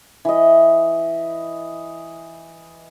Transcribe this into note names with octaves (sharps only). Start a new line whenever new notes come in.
E3 D#5